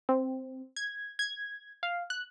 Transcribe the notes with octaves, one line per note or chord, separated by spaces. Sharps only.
C4
G#6
G#6
F5
F#6